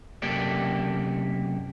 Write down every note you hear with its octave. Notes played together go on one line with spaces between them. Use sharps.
F#2 C3 A#3 G4 A4 D5